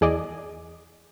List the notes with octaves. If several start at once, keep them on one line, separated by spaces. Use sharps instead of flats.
E2 G#4 D5 D#5